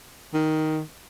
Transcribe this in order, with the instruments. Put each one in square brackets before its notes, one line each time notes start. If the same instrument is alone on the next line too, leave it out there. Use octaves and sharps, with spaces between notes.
[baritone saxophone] D#3